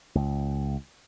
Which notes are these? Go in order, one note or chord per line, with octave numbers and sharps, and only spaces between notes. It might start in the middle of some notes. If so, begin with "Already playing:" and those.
C#2